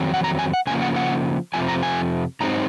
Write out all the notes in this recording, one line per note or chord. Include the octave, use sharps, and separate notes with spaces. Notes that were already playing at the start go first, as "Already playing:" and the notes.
Already playing: F2 D#3 F#3 C4
F#5
A#5
G#5
F#5
C#3 F3 A#3 G#5
F#5
F#5
F2 C3 F3 G#5
A#5
G#5
G#2 D#3 F#3 C4 D#4 A#5